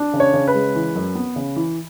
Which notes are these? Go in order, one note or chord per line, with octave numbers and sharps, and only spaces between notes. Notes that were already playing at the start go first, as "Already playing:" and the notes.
Already playing: D4
C#3
C#5
C#3
B4
G#3
E3
F#2
B3
C#3
E3